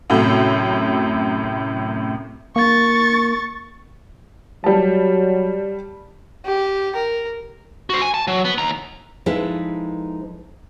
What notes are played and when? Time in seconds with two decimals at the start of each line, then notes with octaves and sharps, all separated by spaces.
0.10 F#2 A2 C3
2.56 A#3 C#6 A6
4.64 F#3 G3 A5
6.45 G4
6.96 A#4
7.90 F#4 C5
8.02 G#5
8.14 A5
8.28 F#3
8.45 B3
8.58 D#2 A#5
9.26 F3 G#3 D#4 E4 A4 B4